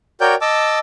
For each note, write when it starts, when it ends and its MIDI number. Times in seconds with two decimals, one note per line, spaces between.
0.21 0.35 66
0.21 0.35 70
0.21 0.35 73
0.21 0.35 74
0.21 0.35 79
0.21 0.35 91
0.41 0.79 75
0.41 0.79 81
0.41 0.79 86
0.41 0.79 88